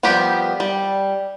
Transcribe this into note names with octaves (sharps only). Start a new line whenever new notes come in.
F3 G3 B3 G4 A#4
G3